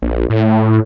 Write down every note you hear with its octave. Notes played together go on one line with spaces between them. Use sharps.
A#1
A2